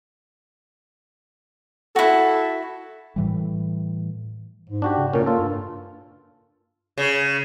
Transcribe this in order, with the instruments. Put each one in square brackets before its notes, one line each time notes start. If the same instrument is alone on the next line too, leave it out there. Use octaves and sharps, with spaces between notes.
[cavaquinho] E4 F#4 [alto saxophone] A4
[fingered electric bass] A2 E3 G3
[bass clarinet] G#2
[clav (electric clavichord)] D4 F#4 G4
[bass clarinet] C#3
[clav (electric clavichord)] A#2 C#4 [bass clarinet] A#4
[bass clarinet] A#3 [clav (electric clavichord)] F4 A4
[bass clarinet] G2
[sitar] C#3